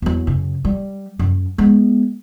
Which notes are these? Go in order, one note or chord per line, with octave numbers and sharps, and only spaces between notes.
E2 F#3
F#2 C#3
G3
F#2
G#3 B3